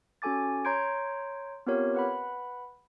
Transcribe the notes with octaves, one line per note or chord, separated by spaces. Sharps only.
C#4 F#4 A4 G#5 D6 A6
C#5 A#5 C6 G6 G#6 D7
B3 C4 F4 G4 A#4 C#5
B4 F#5 B5